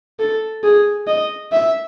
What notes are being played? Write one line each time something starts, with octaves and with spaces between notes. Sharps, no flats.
A4
G#4
D#5
E5